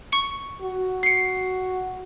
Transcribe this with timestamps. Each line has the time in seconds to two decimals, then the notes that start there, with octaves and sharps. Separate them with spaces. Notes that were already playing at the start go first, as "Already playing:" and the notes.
0.12 C#6 C#7
0.62 F#4
1.03 C7 C#7